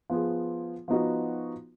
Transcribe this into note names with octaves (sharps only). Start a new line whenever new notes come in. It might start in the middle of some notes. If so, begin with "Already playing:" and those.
F3 B3 F4 G#4
F3 B3 D#4 F#4